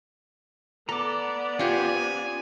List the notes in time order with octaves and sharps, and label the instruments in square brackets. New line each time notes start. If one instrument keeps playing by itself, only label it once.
[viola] B3 D5 [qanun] A4 [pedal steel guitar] A#5 D6
[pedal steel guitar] C#4 C5 F#5 [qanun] F4 G4 [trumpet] G#5